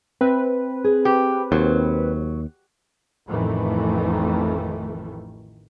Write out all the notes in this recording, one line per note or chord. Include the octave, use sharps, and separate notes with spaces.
C4 B4 E5
G#4
G4
D#2 F#3 C5
A1 F2 A2 D#3 E3 A3